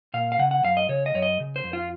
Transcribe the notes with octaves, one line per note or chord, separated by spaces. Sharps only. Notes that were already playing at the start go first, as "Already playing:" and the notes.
A#2 F5
F5
C#3 F#5
F#5
F#2 F5
D#5
C#3 C#5
D#5
F#2 C#5
D#5
C#3
C5
F2
F4